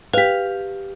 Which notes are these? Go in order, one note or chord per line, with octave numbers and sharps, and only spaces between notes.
G4 B4 F5 B6